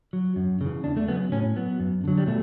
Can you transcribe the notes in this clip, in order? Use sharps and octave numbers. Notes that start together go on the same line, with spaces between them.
F#3
F#2
C#3 E3
E2 D4
A3
C#3 F#3 B3
A2 C#4
F#3 B3
F#2
D3 F#3
G3
B2 A3